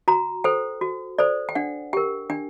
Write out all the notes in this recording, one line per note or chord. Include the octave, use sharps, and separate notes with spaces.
F#4 A#5
A4 C5 G5
F#4
A4 C5 D5
G5
D4 F#5
G4 A#4 G5
D4 G5